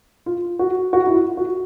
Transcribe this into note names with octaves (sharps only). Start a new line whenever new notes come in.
F4
F#4
F#4
E4
F4
F#4